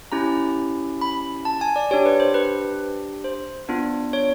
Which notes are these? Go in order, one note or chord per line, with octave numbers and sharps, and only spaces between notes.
C#4 E4 G4 A#5
B5
A5
G#5
D5
D4 G4 C#5
B4
C5
B4
C5
B3 D4 F4
C#5